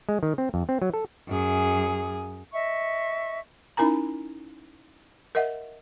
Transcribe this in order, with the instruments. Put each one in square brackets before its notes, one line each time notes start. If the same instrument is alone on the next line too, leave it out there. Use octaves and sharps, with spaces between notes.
[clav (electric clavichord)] G#3
D#3
C4
F2
C4
F#3
A4
[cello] F#2 G#4
[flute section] D#5 E5 C#6
[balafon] C#4 D#4 E4 A#4 G#5 A#5
A#4 D#5 E5 F#5